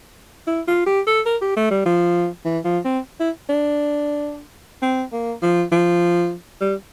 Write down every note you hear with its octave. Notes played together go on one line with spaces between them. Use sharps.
E4
F4
G4
A4
A#4
G4
A3
G3
F3
E3
F3
C4
E4
D4
C4
A#3
F3
F3
G3